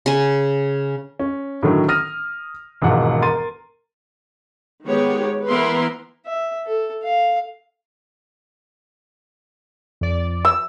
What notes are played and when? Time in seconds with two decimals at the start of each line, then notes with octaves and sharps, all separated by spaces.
0.06 C#3 G#5
1.19 C#4
1.63 A2 D3 D#3 F#3
1.88 D#6 F6 A#6 D#7
2.82 E1 D#2 G#2 F3 F#5
3.22 A#4 C6 A6 D#7
4.87 D#3 G#3 B3 G4 C#5
5.47 E3 B3 E4 A#4 B4 C6
6.25 E5
6.66 A4
7.03 F5
10.01 F2 D5
10.45 E6